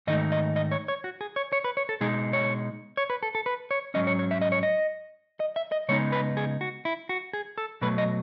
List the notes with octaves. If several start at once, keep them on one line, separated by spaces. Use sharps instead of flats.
G#2 D#3 A3 D#4 D#5
D#5
D#5
C#5
C#5
F#4
G#4
C#5
C#5
B4
C#5
A4
B2 G#3 D#4 G#4
C#5
C#5
B4
A4
A4
B4
C#5
G#2 F#3 C#4 D#5
C#5
C#5
E5
D#5
C#5
D#5
D#5
E5
D#5
C#3 G#3 B3 D#4 C#5
B4
G#4
F#4
E4
F#4
G#4
A4
B2 F#3 A3 B4
D#5